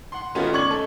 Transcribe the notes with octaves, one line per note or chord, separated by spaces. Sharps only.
F#5 C6
D#3 A3 B3 C#4 F4 F#4
C#4 D5 C#6 G#6 F#7
A3 D#4 A4